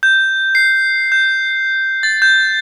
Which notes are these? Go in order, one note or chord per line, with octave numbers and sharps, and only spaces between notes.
G6
C7
G6
A6
G6